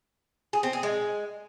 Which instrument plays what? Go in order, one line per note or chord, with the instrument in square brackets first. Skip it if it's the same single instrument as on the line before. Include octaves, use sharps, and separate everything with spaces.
[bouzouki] G#4
C4
G#4
G#3